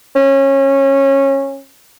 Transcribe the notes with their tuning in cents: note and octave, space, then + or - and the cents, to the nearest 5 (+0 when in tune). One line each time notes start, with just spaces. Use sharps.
C#4 -20